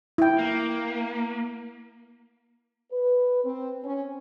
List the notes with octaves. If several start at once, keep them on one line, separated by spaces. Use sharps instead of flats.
E4 G5
A#3
B4
C4
C#4